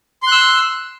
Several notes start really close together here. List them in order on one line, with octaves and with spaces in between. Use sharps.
C6 F#6 E6